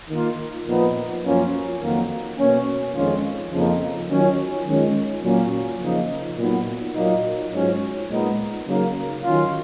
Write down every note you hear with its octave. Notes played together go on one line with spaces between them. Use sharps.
D#3 A#3 F4
A#2 F3 B3 D#4
F#2 F3 A#3 C#4 F4
F2 D#3 F#3 A#3
B2 A#3 C#4
F2 D#3 G#3 C#4 F4
F2 C#3 F3 A#3 D#4
D#3 F#3 C#4 F4
D#3 G#3 C#4 F4
A#2 F#3 A#3 C#4
C#3 F3 A#3 D#4
A#2 F#3 B3 D#4
A#2 F#3 A#3 D#4
G#2 F#3 C#4 F4
A#2 G#3 B3 D#4
C#3 F#3 A#3 D#4
D#3 F#3 C#4 F4